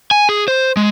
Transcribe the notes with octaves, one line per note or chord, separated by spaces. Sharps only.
G#5
G#4
C5
G#3